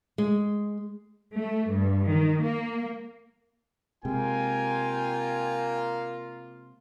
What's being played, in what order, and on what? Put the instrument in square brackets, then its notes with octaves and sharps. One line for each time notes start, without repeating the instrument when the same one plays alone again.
[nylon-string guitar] G#3
[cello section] A3
G2
D#3
A#3
[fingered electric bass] C3 G#3 [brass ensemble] A#3 F4 [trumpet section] G5 G#5